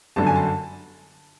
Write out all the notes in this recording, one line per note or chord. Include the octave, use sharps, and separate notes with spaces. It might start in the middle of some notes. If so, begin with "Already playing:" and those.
G1 F#2 D3 A5
G#5
A5